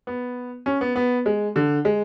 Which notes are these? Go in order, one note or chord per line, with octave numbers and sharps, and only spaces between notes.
B3
C#4
B3
B3
G#3
D3
G#3